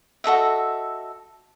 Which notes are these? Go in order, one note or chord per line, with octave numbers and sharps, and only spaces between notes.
F#4 A4 D#5 E5